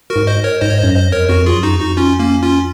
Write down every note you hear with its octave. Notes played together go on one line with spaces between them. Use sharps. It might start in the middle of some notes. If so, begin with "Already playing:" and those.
F#4 A#4
G#2
C5 D#5
A#4 C#5
G#2 C5 D#5
C#5
C5 D#5
F#2
C5 D#5
F2
A#4 C#5
F2 F#4 A#4
F4 G#4
F#2
D#4 F#4
F2
D#4 F#4
C#4 F4
A#3 C#4
C#4 F4